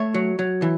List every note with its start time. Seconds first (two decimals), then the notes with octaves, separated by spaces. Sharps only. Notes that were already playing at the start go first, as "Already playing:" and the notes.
Already playing: A3 C#5 E5
0.14 F#3
0.39 F#3
0.62 E3